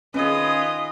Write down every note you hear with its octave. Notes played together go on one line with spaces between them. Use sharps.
D#3 C#4 F4 G#4 B4 D#5